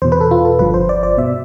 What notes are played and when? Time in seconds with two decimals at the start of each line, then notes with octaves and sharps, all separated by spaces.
0.02 E2 B2 C5
0.12 B4
0.21 A4
0.31 F4
0.45 A4
0.59 G1 G2 F3 B4
0.74 C5
0.89 D5
1.03 D5
1.18 B2 E5